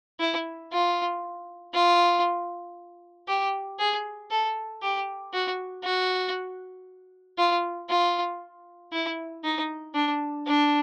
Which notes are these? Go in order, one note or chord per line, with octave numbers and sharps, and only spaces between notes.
E4
F4
F4
G4
G#4
A4
G4
F#4
F#4
F4
F4
E4
D#4
D4
D4